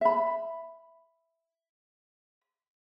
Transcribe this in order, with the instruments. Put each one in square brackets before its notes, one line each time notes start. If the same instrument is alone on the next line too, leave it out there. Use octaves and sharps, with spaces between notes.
[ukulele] E5 B5